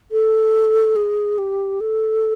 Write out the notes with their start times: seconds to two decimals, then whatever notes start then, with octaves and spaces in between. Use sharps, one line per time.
0.12 A4
0.96 G#4
1.38 G4
1.80 A4